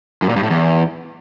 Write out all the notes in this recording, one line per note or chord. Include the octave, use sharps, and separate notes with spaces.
F#2
A#2
G2
A2
E2